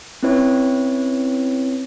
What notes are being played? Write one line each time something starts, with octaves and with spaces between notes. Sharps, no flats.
C4 C#4 E4 B4 C#5